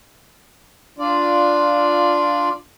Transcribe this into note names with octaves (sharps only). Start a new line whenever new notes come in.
D4 F4 D5